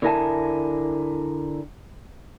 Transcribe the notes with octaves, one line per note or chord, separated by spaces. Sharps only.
D3 E4 A#4 E5 G#5 A5